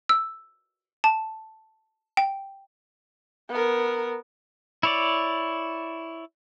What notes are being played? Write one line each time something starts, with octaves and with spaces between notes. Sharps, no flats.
E6
A5
G5
B3 A#4
E4 C#5 D5